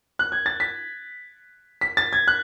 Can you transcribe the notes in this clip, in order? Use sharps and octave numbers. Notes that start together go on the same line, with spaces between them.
F#6
G#6
A6
B6
B6
A6
G#6
F#6